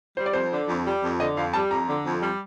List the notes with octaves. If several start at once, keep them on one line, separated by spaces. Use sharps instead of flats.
G3 C5
D5
F2 C5
D3
F2
G3
F2
D3 D#5
F2 F5
G3 A5
F2 A#5
D3
F2
G3